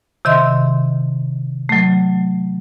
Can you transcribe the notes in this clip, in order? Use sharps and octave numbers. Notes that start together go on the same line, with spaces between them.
C3 D#3 D#5 E5 C6
F#3 A3